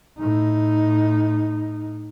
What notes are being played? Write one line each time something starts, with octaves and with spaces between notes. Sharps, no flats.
A2 D#4